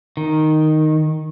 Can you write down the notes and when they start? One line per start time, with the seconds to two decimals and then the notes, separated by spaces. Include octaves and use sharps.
0.17 D#3